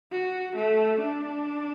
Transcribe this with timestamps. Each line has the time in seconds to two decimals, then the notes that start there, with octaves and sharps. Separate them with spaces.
0.12 F#4
0.56 A3
1.00 D4